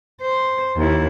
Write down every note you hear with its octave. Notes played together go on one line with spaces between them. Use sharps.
C5
D#2 E4